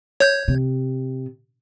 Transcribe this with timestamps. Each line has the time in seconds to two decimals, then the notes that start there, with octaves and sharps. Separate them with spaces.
0.20 C#5 G6 G#6
0.48 C3